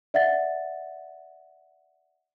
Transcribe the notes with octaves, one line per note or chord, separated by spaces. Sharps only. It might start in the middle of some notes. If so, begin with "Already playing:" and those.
D5 E5 F#5 A6